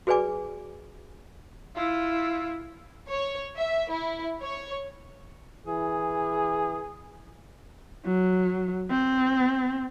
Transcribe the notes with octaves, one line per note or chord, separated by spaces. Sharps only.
F#4 G#4 B4 D5 G#5 D6
E4 F4
C#5
E5
E4
C#5
E3 G#4
F#3
C4